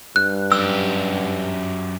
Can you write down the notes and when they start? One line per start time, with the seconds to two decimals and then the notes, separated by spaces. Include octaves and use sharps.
0.16 G2 F#6
0.52 F#2 G4 E6